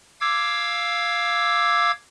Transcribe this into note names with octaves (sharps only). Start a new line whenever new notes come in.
F5 D6 E6 G#6